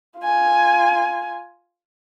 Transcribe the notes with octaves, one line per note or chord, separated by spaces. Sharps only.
F4 G#5